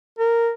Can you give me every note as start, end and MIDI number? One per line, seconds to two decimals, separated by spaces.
0.19 0.50 70